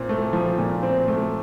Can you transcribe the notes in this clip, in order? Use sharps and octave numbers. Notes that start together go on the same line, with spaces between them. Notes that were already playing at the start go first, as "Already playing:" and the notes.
Already playing: A#2 C4
A3
F3
A#2
C4
A3